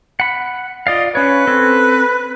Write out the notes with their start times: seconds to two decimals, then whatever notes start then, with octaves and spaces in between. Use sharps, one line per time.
0.20 F#5 B5
0.87 F4 D5 D#5 F5
1.15 C#4 B4 C#5
1.47 C4 A4